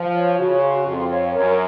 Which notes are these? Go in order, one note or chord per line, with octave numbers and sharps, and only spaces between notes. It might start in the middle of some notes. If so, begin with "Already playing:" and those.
Already playing: F3 F5
C#5
C#3 F#4
C6
F2 F5
C#5
F#2 A#4